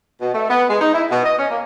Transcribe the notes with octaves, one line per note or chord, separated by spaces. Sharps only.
B2
A3
B3
G#3
D#4
E4
B2
D#5
C#4
A#3